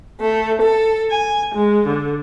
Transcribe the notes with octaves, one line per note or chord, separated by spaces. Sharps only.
A3
A4
G#5
G#3
D3